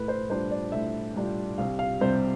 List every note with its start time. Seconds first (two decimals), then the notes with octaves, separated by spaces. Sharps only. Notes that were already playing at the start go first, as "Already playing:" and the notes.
Already playing: A2 B4
0.08 C5
0.30 G3 D4 F4 C5
0.51 D5
0.72 A2 E5
1.15 G3 D4 F4
1.58 C2 F5
1.79 F5
2.01 C3 G3 C4 C5